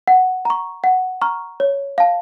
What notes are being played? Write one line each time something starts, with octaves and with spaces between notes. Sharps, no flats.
F#5
A#5 C#6
F#5
A#5 C#6 F6
C#5
F5 A5